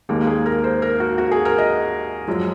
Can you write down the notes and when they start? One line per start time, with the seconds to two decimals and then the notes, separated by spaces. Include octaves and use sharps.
0.09 D#2 D#3 G#3 A#3
0.27 G#4
0.46 A#4
0.64 C5
0.82 A#4
1.00 F#4
1.18 F#4
1.32 G#4
1.45 A#4
1.58 D#5
2.28 F#2 F3 G#3